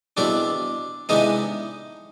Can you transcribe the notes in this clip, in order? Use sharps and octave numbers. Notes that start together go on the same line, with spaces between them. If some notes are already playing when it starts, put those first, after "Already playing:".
E2 B2 G3 C4 D4 D5
C3 E3 G#3 B3 D4 D#4 D#5